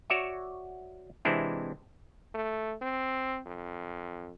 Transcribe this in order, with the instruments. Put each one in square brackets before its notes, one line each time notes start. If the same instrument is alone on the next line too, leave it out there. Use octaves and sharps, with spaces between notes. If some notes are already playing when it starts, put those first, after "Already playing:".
[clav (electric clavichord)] F#4 C#5 D5 E5
C3 E3 G#3 C4 D4 E4
[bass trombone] A3
C4
F2